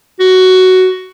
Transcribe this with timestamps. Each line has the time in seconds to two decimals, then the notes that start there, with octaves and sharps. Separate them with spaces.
0.20 F#4